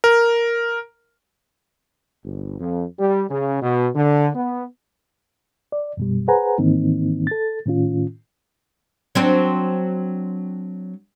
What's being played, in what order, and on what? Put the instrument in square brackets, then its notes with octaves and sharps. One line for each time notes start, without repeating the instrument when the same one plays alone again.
[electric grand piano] A#4
[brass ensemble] G1
F2
G3
C#3
B2
D3
B3
[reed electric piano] D5
F#2 B2 G3
G#4 B4 C5 F#5 G#5 A#5
G#2 D#3 E3 A#3 C4 D#4
A4 A6
A2 D#3 C#4 F4
[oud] F#3 C4 D4